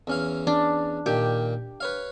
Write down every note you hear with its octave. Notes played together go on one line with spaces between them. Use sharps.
E2 C#4 F5
D4
A#2 D#3 G4
B4 C#5 F5